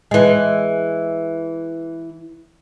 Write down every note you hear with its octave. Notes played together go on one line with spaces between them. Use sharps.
E3 G#3